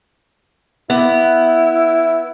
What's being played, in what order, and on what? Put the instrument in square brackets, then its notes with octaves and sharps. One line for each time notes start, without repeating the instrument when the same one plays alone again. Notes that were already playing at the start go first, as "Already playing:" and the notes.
[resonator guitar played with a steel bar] B3 [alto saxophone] E4